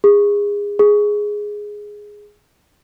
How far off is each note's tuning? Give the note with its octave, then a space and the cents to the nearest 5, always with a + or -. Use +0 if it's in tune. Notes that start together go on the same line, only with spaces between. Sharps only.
G#4 -25
G#4 +0